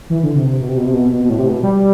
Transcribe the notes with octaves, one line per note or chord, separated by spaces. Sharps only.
E3
D3
C3
C3
B2
C3
B2
C3
B2
B2
B2
A2
C3
B2
G3